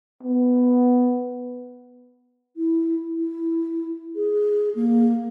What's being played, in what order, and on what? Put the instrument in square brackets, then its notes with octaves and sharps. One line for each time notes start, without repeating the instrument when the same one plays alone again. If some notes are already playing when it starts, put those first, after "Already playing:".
[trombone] B3
[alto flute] E4
E4
G#4
A#3